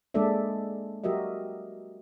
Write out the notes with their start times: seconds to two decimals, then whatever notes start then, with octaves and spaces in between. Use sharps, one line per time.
0.14 G#3 A#3 D4 A4 D5 E5
1.04 F#3 F#4 G4 A#4 D#5 E5